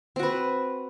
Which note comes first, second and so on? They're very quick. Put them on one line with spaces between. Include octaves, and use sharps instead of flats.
C4 F#4 B4